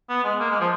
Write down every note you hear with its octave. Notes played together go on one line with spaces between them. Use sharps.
B3
G#3
A#3
G#3
F3